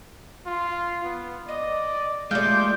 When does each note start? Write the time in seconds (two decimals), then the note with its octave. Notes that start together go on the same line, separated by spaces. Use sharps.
0.47 F4
1.04 B3
1.48 D5 D#5
2.31 G#3 A3 F4 G4 D5 G6